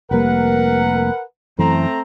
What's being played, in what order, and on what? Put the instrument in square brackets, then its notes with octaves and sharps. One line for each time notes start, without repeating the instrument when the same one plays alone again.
[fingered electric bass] F1 G3 A#3 [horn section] A#4 B4 F#5
[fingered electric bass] F#2 E3 [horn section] A3 C4 A#5